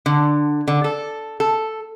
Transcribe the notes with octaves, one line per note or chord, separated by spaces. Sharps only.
D3
D3
A4
A4